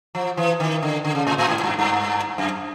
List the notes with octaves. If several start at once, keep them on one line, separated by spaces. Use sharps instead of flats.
F3
E3
D#3
D3
D3
C#3
A2
A2
G#2
G#2
G2
G2
F#2